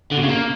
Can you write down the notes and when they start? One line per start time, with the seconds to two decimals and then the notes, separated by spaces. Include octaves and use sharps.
0.11 D3
0.17 B2
0.22 C#3
0.28 A#3